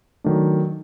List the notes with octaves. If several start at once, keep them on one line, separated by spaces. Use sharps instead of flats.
D#3 F#3 A3 D4